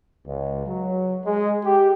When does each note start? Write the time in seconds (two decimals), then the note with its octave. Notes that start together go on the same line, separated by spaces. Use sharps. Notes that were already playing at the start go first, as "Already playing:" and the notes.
0.27 C#2
0.66 F#3
1.26 G#3
1.65 G4